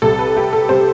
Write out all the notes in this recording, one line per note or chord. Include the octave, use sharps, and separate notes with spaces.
C2 C3 G3 A4
B4
G4
A4
C3 G3 C5